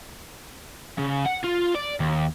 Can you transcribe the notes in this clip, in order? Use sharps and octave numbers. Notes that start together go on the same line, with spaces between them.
C#3
F#5
F4
D5
D#2